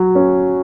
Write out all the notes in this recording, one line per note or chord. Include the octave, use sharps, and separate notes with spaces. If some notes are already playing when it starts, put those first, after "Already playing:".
Already playing: F#3
C#4